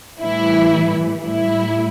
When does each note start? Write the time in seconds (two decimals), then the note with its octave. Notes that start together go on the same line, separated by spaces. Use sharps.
0.22 A2 E3 G3 E4
1.22 A2 G3 E4